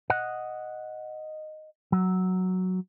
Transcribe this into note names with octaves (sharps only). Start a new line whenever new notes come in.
D#5 F#5
F#3